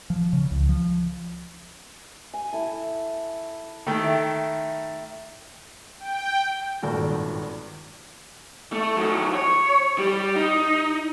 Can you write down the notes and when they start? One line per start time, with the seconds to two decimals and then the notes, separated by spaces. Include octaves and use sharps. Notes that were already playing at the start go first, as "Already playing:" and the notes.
0.10 F3
0.33 C#3
0.51 C#2
0.69 F3
2.33 G#5
2.53 E4 A4
3.87 D#3 A3 G5
4.04 E5
6.00 G5
6.82 D#1 G#1 G2 A#2 F#4
8.73 A3
8.98 D#3 F#3
9.35 C#5
9.98 G3
10.36 D#4